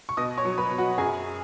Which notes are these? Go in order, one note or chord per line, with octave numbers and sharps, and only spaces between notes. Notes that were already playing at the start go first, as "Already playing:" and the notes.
C#6
B2 D#5 D#6
C#5 C#6
F#3
B4 B5
B2
F#4 F#5
F#2 G#4 G#5